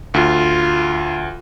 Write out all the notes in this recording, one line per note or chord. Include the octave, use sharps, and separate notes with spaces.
D2 F4